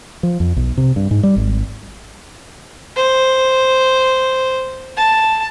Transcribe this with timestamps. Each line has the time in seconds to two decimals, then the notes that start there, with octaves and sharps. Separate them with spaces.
0.23 F3
0.40 F2
0.56 B1
0.77 C3
0.96 G2
1.11 G#2
1.23 G3
1.36 G#1
2.96 C5
4.97 A5